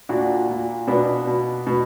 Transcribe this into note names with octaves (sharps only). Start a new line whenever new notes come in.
A#2 D4 F#4
A#2
B2 B3 D4
B2
B2